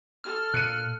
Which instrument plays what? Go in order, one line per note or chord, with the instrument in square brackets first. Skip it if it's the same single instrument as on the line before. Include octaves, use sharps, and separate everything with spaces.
[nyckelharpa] A4 [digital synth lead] F6
[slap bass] A#2 [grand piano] F#6 C#7 D#7